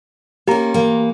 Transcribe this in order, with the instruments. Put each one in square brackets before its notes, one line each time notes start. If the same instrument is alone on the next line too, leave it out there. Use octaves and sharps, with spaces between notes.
[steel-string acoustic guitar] A#3 C#4 [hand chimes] G4 A#5
[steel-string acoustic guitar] E3 A#3